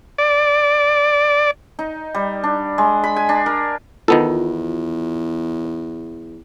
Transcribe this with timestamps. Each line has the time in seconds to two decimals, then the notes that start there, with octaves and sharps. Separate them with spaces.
0.18 D5
1.79 D#4
2.14 G3
2.44 D4
2.78 G#3
3.04 B5
3.16 G#5
3.29 D4
3.46 A#4
4.08 E2 D#3 B3 F4 A4